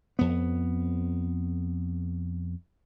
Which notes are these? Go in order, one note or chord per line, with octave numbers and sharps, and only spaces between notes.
F2 B3